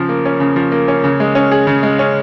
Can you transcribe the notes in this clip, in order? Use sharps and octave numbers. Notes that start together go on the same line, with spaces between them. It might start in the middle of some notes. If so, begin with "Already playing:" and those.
Already playing: C#3 F3
A#3
C#4
C#3
F3
A#3
C#4
C#3
G#3
C#4
G#4
C#3
G#3
C#4